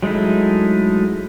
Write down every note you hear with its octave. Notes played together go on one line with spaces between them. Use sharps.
F#3 G#3 A3 D#4 E4